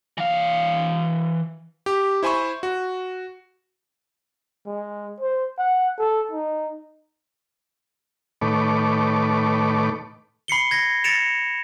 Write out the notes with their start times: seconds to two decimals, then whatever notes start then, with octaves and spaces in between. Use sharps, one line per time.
0.18 E3 F5
1.86 G4
2.23 E4 C5 G#5 B5 C#6
2.63 F#4
4.66 G#3
5.20 C5
5.58 F#5
5.99 A4
6.32 D#4
8.41 A2 D#3 A3 B4 C#5 D6
10.48 B5 C7 C#7 G7
10.71 G#6 A#6
11.04 A6 A#6 C#7 D7 E7 F7